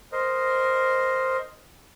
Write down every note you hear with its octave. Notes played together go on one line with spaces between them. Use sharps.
A#4 C5 D#5